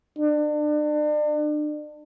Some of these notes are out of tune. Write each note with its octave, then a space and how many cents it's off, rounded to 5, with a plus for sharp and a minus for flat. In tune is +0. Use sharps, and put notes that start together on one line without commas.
D4 +35